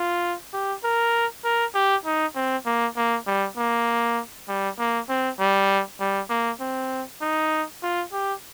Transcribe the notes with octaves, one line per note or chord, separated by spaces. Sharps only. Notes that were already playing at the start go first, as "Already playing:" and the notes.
Already playing: F4
G4
A#4
A#4
G4
D#4
C4
A#3
A#3
G3
A#3
G3
A#3
C4
G3
G3
A#3
C4
D#4
F4
G4